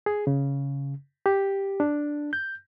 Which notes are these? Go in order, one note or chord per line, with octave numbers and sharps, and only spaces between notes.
G#4
C#3
G4
D4
G6